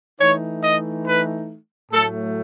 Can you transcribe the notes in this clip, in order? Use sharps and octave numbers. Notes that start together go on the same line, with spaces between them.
E3 A3 D#4 C#5
D#5
B4
A2 F#3 A3 A4